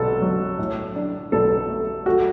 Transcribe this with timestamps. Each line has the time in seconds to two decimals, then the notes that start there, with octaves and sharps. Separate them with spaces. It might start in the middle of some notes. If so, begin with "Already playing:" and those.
Already playing: B1 A4
0.22 F#3
0.59 A2
0.95 D4
1.32 B1 A4
1.69 A3
2.06 A3 F#4